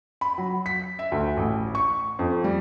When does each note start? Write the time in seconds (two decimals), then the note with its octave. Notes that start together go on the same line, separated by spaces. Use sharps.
0.21 B5
0.38 F#3
0.66 B6
0.99 E5
1.12 D2
1.37 A1
1.75 C#6
2.19 F2
2.44 G3